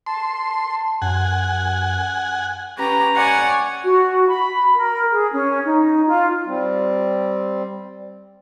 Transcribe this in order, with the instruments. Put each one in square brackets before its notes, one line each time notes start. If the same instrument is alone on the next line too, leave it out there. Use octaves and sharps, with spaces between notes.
[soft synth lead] A5 [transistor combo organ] C6
[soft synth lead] F#2 [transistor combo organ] F#5 G#5
[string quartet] C#4 G4 B4 A#5
C#5 D5 F#5 G#5
[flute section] F#4
B5
A#4
G#4
C#4
D#4
F4
[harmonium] G3 C4